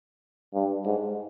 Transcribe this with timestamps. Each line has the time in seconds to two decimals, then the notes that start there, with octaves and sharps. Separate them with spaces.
0.54 G2
0.85 G#2